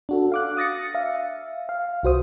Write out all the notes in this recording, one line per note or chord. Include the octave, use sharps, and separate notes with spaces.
D4 F#4 A4
F5 D6 F#6
D#6 A6 A#6 C#7
E5 F5
F5
C2 F#4 C5 D#6